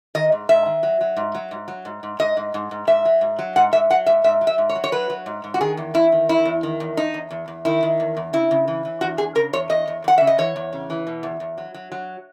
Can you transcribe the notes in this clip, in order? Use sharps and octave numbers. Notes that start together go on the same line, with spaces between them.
D#3 D#5
G#2
G#2 E5
D#3
F#3
F#3
G#2
F#3
G#2
F#3
G#2
G#2
G#2 D#5
G#2
G#2
G#2
G#2 E5
F#3
G#2
F#3
G#2 F#5
G#2 E5
F#3 F#5
G#2 E5
G#2 E5
F#3
E5
G#2
C#5
F#3
C#5
F#3 B4
F#3
G#2
G#2
F#4
D#3 G#4
E2
E2 E4
D#3
E2 E4
E2
D#3
E2
E2 D#4
E2
E2
E2
D#3 E4
D#3
E2
E2
C#3 E4
C#3
E3
E3
E2 F#4
E2 G#4
C#3 A#4
E2 C#5
E2 D#5
E2
E2 F#5
C#3 E5
D#5
E3 C#5
E2
C#3
E3
B2
E2
E2
F#3
F#3
F#3